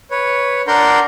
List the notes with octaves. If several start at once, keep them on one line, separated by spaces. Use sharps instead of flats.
B4 C#5
D4 A#4 F#5 A#5 C6 G6